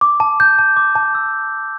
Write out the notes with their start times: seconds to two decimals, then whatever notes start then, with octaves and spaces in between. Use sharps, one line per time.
0.01 D6
0.20 A5
0.40 G6
0.59 A5
0.77 D6
0.95 A5
1.15 E6